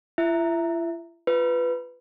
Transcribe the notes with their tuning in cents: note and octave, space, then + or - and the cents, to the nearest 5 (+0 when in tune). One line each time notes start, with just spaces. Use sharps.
E4 +45 E5 +0
F4 -10 B4 +5